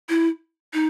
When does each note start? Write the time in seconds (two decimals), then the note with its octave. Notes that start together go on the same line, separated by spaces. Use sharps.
0.09 E4
0.74 D#4